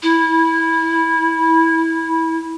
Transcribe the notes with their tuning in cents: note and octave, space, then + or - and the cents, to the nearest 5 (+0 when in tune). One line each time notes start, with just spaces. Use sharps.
E4 -15